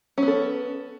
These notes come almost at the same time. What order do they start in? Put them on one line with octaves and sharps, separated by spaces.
C#4 B3 A4